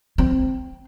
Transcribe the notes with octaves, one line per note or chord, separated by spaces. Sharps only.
C4